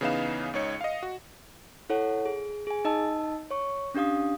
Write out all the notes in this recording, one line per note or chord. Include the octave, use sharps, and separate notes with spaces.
C#3 E3 B3 D#4 F5 E7
C#2 D#4 C#5 C#7
D#5 F5
F#4
E4 A4 C#5 F#5
G#4
G#4 G#5
D#4 D#5 A5 E6
C#5 C#6
C#4 D4 G4 F5 D#6